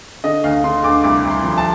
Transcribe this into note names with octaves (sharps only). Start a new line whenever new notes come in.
D3 D#5
D2 F5
D3 C6
D2 D6
C2 D6
C2
C6
F3
A5